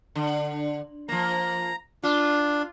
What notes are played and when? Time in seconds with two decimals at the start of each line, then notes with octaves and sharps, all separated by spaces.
0.15 D3
1.09 F3 A#3 A#5
2.03 D4 F4